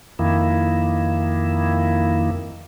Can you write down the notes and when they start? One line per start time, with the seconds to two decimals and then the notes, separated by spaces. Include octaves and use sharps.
0.19 F2 D#3 A#3 E4